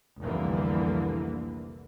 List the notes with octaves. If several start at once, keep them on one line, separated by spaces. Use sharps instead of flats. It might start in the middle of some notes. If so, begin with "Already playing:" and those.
F1 C2 D3 E3 A#3